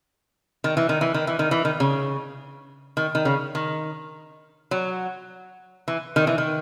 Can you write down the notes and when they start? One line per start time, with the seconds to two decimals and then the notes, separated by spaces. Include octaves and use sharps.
0.64 D#3
0.77 E3
0.89 D#3
1.01 E3
1.14 D#3
1.27 E3
1.39 D#3
1.51 E3
1.65 D#3
1.80 C#3
2.97 D#3
3.15 D#3
3.25 C#3
3.55 D#3
4.71 F#3
5.88 E3
6.16 D#3
6.27 E3
6.38 D#3